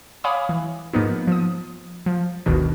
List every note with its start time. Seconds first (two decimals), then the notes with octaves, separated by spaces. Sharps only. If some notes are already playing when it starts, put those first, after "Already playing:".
0.24 C#5 F5 G#5 B5 D6 D#6
0.49 E3
0.94 G#2 F3 A#3 B3 D#4
1.27 F3 D#6
2.06 F3
2.46 G1 D2 B2 D#3 D4